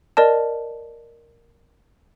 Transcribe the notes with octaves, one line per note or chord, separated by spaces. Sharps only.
A#4 D5 D#5 A5